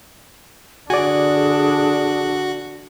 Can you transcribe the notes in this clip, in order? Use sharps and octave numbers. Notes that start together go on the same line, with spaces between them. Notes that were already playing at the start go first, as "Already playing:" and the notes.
D3 D4 F#4 G#4 D5 G#5